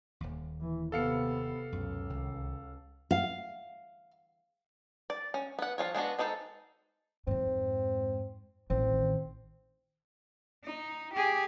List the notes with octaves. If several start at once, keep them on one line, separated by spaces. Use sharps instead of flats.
D#1 D#2
E3
C3 B3 A4 F5 C#7
C#2 F#2 B2
C2 D#3
F5
D5
C#4
B3 F#5
F3 C#4 F4 C#5
G#3 B3 D4 F#4
G#3 D4 D#4 A4 C5
F2 G#2 C4
A1 D#3 C4
D#4
G4 G#4